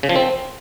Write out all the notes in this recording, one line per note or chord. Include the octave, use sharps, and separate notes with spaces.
C#3
F3
C4